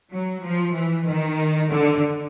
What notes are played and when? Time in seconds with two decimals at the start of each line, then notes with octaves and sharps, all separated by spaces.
0.12 F#3
0.44 F3
0.74 E3
1.07 D#3
1.70 D3